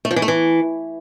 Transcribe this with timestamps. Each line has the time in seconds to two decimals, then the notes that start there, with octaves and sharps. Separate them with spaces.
0.05 A3
0.11 F3
0.16 E3
0.22 A3
0.28 E3